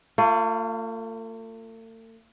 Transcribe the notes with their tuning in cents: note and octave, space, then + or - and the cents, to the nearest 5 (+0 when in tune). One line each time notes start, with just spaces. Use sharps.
A3 +45 F4 +0